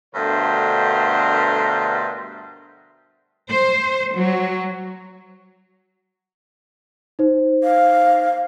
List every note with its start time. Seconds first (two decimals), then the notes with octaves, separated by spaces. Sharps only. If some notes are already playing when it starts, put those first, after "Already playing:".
0.15 G2 B2 D3 A3 A#4 C5
3.50 C5
4.15 F#3
7.19 D#4 C5
7.64 F5